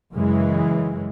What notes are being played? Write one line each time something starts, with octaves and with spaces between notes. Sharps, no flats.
F#2 C#3 E3 G#3